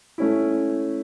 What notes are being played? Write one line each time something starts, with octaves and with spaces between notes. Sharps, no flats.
A3 C#4 E4